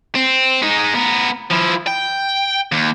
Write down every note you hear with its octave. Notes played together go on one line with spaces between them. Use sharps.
C4
G#3 D#4
B3 A#4
F3 E4
G5
D#2